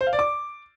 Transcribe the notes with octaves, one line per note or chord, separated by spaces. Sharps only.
C5
F5
D5
D6